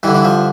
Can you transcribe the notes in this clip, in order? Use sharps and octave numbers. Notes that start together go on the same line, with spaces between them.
G2 D3 E3
E3
F3